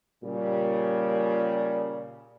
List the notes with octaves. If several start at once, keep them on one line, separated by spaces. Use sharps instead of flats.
A#2 C#3 G3